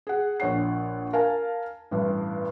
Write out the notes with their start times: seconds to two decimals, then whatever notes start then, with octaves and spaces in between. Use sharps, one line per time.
0.07 G#4 F#5
0.40 A#1 C#5 F#5 C7
1.13 A#4 F5 G#5 A5
1.91 A1 G2